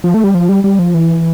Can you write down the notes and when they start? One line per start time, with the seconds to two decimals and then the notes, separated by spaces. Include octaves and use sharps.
0.04 F3
0.14 A3
0.24 G3
0.34 F3
0.49 G3
0.64 G3
0.79 F3
0.94 E3